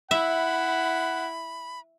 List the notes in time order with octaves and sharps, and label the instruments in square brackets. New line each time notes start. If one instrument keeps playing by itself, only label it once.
[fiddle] E4 [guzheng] E5 [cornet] F#5 [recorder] B5